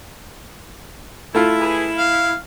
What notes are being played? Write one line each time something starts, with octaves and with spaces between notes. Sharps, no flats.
A3 E4 F4
G#4 B4
F5